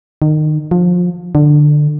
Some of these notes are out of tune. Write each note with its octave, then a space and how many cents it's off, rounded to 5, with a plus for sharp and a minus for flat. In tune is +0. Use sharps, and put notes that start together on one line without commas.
D#3 -25
F3 +25
D3 +15